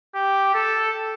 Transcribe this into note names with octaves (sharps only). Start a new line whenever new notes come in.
G4
A4